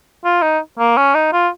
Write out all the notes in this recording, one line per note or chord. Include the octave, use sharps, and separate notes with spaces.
F4
D#4
A#3
C#4
D#4
F4